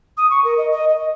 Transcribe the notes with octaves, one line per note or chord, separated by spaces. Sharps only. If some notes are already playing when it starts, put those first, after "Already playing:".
D#6
C#6
A#4
D#5
D#5
D#5